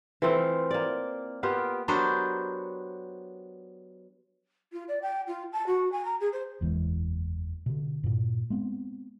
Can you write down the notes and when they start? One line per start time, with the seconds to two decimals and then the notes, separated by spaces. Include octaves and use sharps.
0.22 E3 A3 C4 F4
0.71 A#3 D5
1.43 A#3 B3 F4 G4
1.88 F#3 B3 D4 G4 A#4 C5
4.73 F4
4.88 D5
5.02 G5
5.27 F4
5.53 A5
5.67 F#4
5.92 G#5
6.05 A#5
6.20 G#4
6.33 C5
6.61 F#1 E2 E3 G#3
7.66 B2 D3
8.04 G2 A#2
8.50 G#3 B3 C4